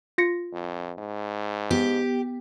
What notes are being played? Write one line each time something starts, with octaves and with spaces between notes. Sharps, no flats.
F4 A#6 C#7
F2
G#2
B3 G4